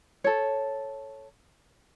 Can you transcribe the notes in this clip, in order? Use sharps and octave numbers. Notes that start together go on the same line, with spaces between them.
A4 C#5